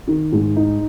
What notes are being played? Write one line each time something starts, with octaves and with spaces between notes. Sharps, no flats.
D#3
G#2
D#4